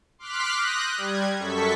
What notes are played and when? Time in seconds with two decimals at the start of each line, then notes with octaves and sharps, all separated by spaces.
0.18 C6 D6 F6 F#6 B6
0.58 D#6 F#6 G6 A#6
0.98 G3 G#6
1.38 F#2 A4 C#6 B6